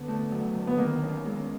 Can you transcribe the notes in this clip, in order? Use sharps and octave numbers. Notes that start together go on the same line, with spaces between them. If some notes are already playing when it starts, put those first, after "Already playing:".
Already playing: D3 B3
A3
F#3
D3
B3
D#3 A#3
C#4
G#3